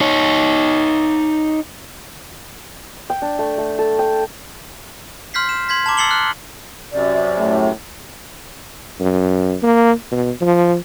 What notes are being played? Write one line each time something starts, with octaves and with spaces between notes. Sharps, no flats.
D#4 C#5
G5
D4
A3
A3
A4
G5
C6 F6 G6 B6 C7
E7
C6 G#6 B6
A5 A#5 D6
E6 A6 C7 C#7 F#7 G7
F6 F#6
F#2 C3 D5
A2
F#2
A#3
B2
F3